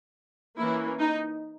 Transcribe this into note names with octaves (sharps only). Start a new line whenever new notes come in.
E3 A#3 C#4 E4
D#4